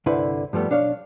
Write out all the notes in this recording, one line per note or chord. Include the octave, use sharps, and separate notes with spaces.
C2 G2 D3 E4 B4 C5
G2 F3 G3 A3 B3
B1 D4 C#5 F5